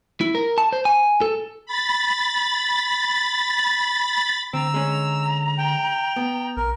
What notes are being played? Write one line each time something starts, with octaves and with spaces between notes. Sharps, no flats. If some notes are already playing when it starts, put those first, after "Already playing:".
E4
A#4
A5
C5
G#5
A4
B5 A6
D3 C4 A#5 E6
G#3 C#4
G5
B3
B1 A#4